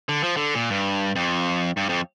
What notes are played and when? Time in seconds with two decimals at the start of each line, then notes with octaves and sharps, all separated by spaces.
0.09 D3
0.23 F3
0.37 D3
0.55 A#2
0.70 G2
1.16 F2
1.77 G2
1.89 F2